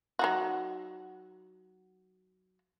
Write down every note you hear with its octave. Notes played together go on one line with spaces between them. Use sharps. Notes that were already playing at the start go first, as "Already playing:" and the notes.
F#3 D#4 F#4